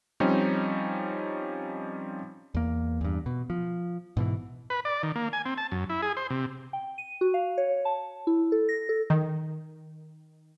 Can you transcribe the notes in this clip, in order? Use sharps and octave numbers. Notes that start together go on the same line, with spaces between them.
F3 G3 C4 C#4 D#4
E2 A#3
E2 G2
B2
F3
G#2 B2 E3
B4
D5
D#3
A#3
G#5
C4
A5
F#2
E4
G#4
C5
C3
G5
D#7
F#4
F5
C#5
A5
E4
A4
A#6
A4
D#3